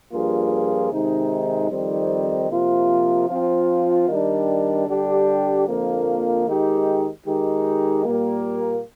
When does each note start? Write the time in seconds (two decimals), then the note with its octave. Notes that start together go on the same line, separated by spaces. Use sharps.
0.12 G2 F3 A#3 F4 G#4
0.91 C3 D#3 G#3 D#4
1.70 F2 D#3 G3 C4 D#4
2.49 C3 F3 A#3 F4
3.29 F3 C4 F4
4.08 D#3 G3 D4
4.87 D3 G3 D4 G4
5.67 F2 D3 F3 A#3
6.46 D#3 G#3 D#4 G4
7.26 D#3 G#3 D#4 G4
8.05 A#2 G3 A#3